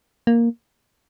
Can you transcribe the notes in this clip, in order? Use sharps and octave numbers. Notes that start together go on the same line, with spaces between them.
A#3